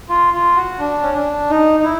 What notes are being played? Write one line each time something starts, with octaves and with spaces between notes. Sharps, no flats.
F4
F4
F#4
D4
C#4
D4
D#4
D#4
E4